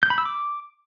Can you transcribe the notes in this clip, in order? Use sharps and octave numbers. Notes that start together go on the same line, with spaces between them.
G6
B5
E6
D6